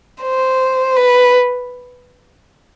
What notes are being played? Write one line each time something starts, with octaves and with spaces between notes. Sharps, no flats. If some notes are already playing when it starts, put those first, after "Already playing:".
C5
B4